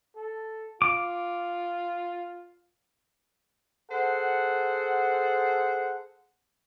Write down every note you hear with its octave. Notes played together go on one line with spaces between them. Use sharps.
A4
F4 D6
G#4 A4 C5 F#5